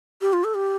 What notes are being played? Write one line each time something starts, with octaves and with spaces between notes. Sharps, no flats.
G4
F4
A4
G4